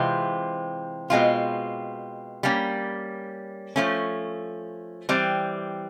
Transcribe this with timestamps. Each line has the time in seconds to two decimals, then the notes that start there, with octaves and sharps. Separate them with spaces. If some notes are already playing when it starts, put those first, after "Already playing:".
Already playing: C3 E3 G#3 C4 F4
1.10 B2 G#3 C4 F4
2.43 G3 A#3 C#4
3.76 F3 A3 C#4
5.09 E3 G3 C4